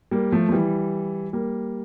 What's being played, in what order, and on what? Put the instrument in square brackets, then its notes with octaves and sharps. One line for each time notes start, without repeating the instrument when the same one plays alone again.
[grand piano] G3 A#3
F3 A3
F3
E3 G3
G3 A#3